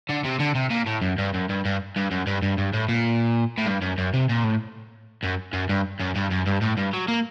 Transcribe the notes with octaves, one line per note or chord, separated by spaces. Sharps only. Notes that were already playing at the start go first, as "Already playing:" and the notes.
D3
C3
D3
C3
A#2
A2
F#2
G2
F#2
G2
G2
G2
F#2
G2
G2
G2
A2
A#2
A2
G2
F#2
F#2
C3
A#2
A2
F#2
F#2
G2
F#2
G2
F#2
G2
A2
G2
F#3
A#3